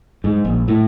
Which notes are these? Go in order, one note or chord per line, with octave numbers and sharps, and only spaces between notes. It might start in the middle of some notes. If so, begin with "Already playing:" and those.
G#2
A#1
A2